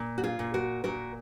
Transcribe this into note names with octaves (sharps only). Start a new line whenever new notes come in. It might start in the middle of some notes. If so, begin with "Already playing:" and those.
Already playing: A#2
F#4
F4 G#4
A#2
F#4 A#4
A#2 F#4 A#4